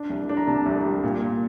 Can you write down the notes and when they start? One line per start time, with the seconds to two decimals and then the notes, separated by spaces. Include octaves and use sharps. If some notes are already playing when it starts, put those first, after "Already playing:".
Already playing: D4
0.10 C2
0.29 D4
0.37 A#5
0.47 C3 A5
0.66 C2
0.85 G3
1.03 A#2
1.22 A#2